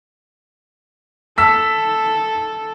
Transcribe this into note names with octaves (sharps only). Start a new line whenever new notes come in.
A4 A5 E6 B6